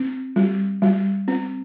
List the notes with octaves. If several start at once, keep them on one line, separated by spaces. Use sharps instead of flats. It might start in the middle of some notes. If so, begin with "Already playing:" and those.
Already playing: C4
G3
G3
C4